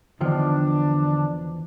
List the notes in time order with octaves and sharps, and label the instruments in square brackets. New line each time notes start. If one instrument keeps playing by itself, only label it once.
[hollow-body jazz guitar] E2 D#3 F3 [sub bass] D3 [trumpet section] D4